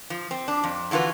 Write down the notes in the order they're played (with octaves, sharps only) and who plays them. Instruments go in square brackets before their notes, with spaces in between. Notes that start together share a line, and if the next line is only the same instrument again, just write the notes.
[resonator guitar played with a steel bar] F3
C4
D4
F2
D3 E3 F4 F#4 B4